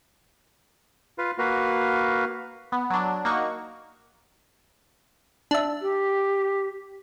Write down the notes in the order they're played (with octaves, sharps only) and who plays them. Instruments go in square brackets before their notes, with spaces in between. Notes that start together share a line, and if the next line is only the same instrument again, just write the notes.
[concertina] F4 B4 F5
A#3 F#4 B4 F5
[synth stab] B3
F#3 D4
A#3 D#4 F#4 C#6
D4 E5
[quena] G4